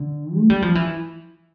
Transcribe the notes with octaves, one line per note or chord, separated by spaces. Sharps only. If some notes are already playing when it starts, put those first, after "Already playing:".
Already playing: D3
A3
G3
F3
E3